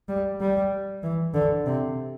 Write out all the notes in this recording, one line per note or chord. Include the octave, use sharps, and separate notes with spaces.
G3
G3
E3
D3
C3